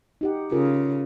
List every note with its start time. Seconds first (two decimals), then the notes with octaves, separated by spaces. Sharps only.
0.21 D#4 G4 F#5
0.52 C#3 F4 G#4 A#4